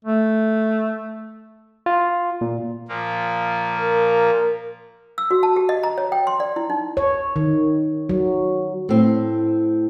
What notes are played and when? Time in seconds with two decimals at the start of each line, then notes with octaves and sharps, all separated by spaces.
0.05 A3
1.86 F4
2.41 A#2
2.88 A#2 F3 A#3
3.79 A#4
5.18 E6
5.31 F#4
5.43 A5
5.56 G4
5.69 D#5
5.83 A#5
5.98 C#5
6.12 G5
6.27 C6
6.40 D5
6.56 E4
6.70 D#4
6.97 C#5
7.36 D#3
8.09 F#3
8.89 A2 C4